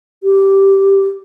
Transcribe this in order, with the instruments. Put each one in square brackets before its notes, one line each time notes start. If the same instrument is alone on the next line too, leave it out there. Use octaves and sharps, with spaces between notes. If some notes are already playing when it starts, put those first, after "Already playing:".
[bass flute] G4